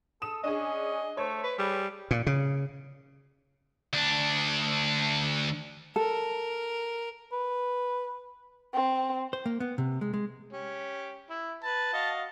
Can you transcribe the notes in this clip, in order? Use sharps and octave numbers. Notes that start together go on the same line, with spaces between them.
A4 D#6 E7
C#4 D4 G#4 D#5
A3 C5 C#5
B4
G3 G#4 B4
A#2
C#3
D2 D4
A4 A#4
B4
C4
C5
A#3
B3
C3
G#3
G#3
C#4 G4
E4
B4 A5
F#4 D#5 F5